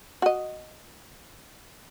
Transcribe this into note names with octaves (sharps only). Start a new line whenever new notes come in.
F#4 D#5